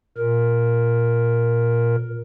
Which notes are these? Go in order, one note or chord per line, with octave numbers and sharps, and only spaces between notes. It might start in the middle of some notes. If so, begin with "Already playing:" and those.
A#2 A#4